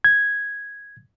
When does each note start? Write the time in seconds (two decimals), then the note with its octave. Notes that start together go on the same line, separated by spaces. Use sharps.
0.04 G#6